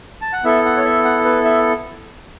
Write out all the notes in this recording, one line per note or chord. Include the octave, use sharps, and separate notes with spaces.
A5
F#5
B3 E4 A4 E5
F#5
C#5
E5
F#5
B4
E5